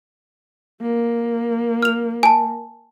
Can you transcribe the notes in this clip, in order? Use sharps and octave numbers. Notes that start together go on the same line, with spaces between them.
A#3
F6 F7
G#5 A5